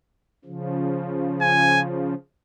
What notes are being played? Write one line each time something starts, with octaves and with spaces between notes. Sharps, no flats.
C#3 F3
G#5